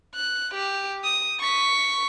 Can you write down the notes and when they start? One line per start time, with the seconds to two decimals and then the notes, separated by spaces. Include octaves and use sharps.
0.15 F#6
0.54 G4
1.04 D#6
1.40 C#6 B6